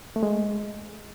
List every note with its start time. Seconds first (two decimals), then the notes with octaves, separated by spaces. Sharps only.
0.16 A3
0.23 G#3